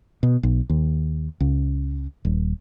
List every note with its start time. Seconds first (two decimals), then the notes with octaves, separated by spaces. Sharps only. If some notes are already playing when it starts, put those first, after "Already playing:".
0.23 B2
0.43 B1
0.70 D#2
1.40 C#2
2.25 D#1